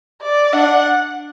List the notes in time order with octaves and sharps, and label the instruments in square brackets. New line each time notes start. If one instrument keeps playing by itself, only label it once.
[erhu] D5
[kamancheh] D4 [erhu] F#5